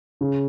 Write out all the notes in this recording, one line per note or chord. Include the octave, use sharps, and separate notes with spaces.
C#3